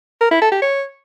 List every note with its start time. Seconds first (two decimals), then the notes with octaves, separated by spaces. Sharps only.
0.21 A#4
0.31 E4
0.42 A4
0.52 G4
0.62 C#5